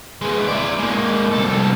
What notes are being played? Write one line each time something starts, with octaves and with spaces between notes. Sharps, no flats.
G#3 B3
E4 D5
G#3 A#3
C2 A4